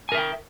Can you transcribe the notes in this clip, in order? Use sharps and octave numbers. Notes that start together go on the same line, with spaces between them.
A#4 E5 G5 G#5